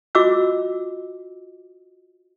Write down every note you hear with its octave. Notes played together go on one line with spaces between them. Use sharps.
F4 F#4 D#5 D6 E6